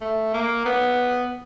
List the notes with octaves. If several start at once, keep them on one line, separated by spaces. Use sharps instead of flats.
A3
A#3
B3